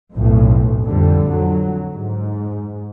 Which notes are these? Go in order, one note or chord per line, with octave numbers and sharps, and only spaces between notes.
B1 F2 A2
F2 D3 G3
F2 F#3
G#2